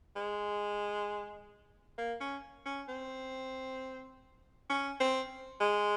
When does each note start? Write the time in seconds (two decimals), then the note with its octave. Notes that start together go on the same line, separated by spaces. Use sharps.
0.16 G#3
1.98 A#3
2.21 C#4
2.66 C#4
2.89 C4
4.70 C#4
5.00 C4
5.61 G#3